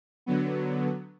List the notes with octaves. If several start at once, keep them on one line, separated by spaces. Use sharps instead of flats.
D3 F#3 B3